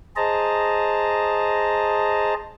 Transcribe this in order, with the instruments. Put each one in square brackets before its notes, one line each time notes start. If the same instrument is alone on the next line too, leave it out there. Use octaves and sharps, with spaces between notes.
[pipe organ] G#4 C5 D#5 A5 A#5